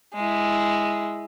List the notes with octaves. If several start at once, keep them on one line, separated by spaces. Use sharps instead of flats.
G#3 E4